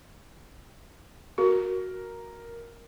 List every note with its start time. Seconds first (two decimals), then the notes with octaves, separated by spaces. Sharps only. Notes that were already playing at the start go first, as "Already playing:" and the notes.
1.38 F#4 A#4